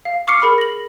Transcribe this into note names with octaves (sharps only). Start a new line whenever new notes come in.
F5
C#6 D6 F6 C7 C#7
G#4 A#4 B5 F6 C#7
A#6 F#7